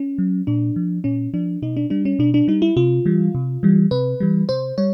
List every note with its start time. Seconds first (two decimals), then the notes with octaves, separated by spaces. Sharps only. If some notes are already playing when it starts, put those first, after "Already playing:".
Already playing: C#4
0.18 F#3
0.47 A#2 D4
0.76 F3
1.04 A#2 C#4
1.34 F3 D4
1.62 B2 D#4
1.77 D4
1.90 G3 D4
2.05 C#4
2.19 B2 D4
2.34 D4
2.48 G3 D#4
2.62 E4
2.76 C3 F4
3.06 E3 G3
3.35 C3
3.63 E3 G3
3.91 C3 B4
4.20 E3 G3
4.49 C3 C5
4.78 G3 C#5